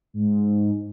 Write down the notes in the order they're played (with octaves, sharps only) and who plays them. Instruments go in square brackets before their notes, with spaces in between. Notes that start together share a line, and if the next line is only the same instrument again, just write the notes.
[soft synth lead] G#2